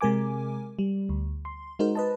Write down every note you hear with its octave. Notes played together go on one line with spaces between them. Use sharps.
C3 G#3 A#4 G#5 D6
G3
D2
C6
G#3 D#4 F#4 A#4 C5
B4 D#5 A5